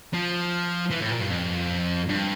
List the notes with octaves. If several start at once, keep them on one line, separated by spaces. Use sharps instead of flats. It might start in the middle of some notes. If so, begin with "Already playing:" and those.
F3
E3
A2
A#2
G2
F2
G2